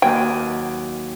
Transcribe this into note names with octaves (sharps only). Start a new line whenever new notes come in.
D#2 F#3 G5 G#5